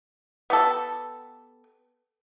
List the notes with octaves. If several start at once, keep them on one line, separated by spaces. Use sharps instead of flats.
B3 G4 A4